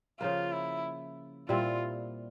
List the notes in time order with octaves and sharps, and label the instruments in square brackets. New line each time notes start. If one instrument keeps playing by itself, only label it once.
[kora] C#3 F3 A#3 [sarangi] F4
[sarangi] E4
[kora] A#2 G3 C4 E4 [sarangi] F4